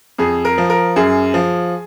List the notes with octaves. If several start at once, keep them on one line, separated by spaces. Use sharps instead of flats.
F2 G#4
A#4
F3
A#4
F#2 G#4
F3